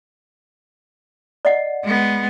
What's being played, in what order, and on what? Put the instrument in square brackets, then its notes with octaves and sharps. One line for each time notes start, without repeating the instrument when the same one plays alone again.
[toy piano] D5 D#5 F#5
[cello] G#3 B3